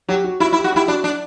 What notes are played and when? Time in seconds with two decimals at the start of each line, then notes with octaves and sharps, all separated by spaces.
0.09 F#3 G4
0.24 F#4
0.40 E4 F#4
0.53 E4
0.57 G4
0.64 F#4
0.72 E4 G4
0.88 D4 F#4
1.04 D4